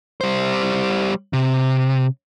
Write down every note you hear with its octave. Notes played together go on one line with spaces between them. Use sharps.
G3 C5
C3